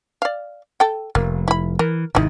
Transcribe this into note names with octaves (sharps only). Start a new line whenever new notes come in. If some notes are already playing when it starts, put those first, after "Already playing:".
D5 F5
A4 G5
F1 A#3
E4 B5
E3 A#4
G#1 C3 D#4 E4